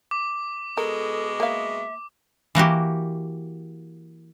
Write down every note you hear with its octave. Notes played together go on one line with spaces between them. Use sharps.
D6
B2 G#3 A4 A#4
A#3 E5 F5
E3 A#3 F#4 G4